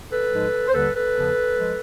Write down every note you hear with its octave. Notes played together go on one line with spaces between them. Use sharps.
A4 B4
G#2 F3 G#3
C5
D#2 D3 G3 A4 B4
A4 B4
E2 C#3 F3
F3 G#3